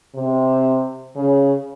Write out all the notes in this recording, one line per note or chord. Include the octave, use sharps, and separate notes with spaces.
C3
C#3